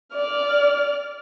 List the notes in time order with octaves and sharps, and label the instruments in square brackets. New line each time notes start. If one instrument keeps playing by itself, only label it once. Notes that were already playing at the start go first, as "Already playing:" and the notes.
[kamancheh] D5 F6